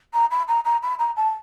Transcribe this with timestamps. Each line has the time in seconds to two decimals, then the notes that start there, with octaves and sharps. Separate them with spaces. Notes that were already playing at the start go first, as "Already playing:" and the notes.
0.14 A#5
0.31 B5
0.48 A#5
0.65 A#5
0.83 B5
0.99 A#5
1.16 A5